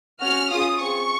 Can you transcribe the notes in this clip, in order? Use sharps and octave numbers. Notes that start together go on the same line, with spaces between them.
C#4 F#4 F6
C#4 F4 G#4 D#6
C4 F4 G#4 C#6